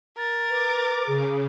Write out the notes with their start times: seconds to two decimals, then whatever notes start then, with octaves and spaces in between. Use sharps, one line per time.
0.18 A#4 A6
0.50 B4 D6
1.07 C#3 G#4